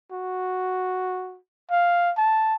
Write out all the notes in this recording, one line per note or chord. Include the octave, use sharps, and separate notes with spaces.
F#4
F5
A5